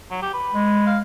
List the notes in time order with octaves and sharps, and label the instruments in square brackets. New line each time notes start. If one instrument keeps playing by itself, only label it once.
[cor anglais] F#3
G4
B4
[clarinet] G#3
[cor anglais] F5